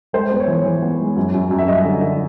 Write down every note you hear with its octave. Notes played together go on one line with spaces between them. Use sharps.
G#3 C5
B3 C5
C#5
E3
E3
B3
G#3
F#2
F#2
F#2
E5
G3 D#5
D3
D3